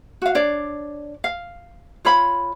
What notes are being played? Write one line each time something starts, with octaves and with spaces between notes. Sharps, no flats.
F#4 F5
D4 C#5 D5
F5
F4 C#5 F5 B5